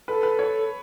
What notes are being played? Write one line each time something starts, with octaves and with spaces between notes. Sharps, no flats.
A4 B4
B4
C#5